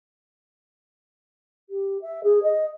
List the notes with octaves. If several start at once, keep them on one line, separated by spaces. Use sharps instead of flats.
G4
E5
G#4
D#5